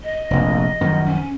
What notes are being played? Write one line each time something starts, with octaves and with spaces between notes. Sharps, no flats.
D#5
F1 A#1
F#2 D#3 F3
C#4